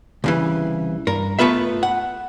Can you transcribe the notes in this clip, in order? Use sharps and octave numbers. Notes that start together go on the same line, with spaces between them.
C2 C#3 E3
G2 A#4
A3 B3 F4 B4 E5
F#5